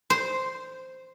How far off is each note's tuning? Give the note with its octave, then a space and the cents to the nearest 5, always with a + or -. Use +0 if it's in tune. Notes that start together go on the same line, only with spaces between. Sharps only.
C5 -5